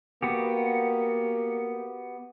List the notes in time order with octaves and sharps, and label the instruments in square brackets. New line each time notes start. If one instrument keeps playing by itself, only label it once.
[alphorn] A#3 [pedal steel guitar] B3 F#4 G4